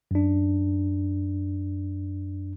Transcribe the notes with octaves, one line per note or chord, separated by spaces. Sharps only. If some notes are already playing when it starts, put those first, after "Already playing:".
F#2 D4